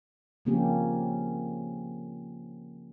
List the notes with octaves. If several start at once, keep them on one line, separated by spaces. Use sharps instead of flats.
C#3 F3 A#3 C4 C#4 G4